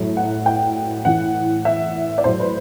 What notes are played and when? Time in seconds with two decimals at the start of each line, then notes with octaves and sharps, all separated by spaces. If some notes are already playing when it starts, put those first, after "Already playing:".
Already playing: A2 F#3
0.17 F#5
0.46 G5
1.05 A2 E3 F#5
1.65 E5
2.18 D5
2.24 A2 F#3 C5
2.40 B4